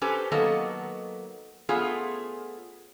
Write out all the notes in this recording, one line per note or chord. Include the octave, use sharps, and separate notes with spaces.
C#4 G4 A4 B4 C5
D#3 F#3 A#3 B3 A4 D#5
A3 B3 C#4 F4 G#4